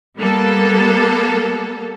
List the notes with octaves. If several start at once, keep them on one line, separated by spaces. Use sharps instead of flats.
G3 A#3 B3 A4